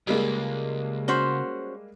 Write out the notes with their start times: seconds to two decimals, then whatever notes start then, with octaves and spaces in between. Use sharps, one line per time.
0.07 C#2 G3 G#3 A#3
1.08 C#4 F#4 C5